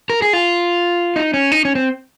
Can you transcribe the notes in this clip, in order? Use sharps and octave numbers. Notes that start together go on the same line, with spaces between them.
A#4
G#4
F4
D#4
C#4
D#4
C#4
C4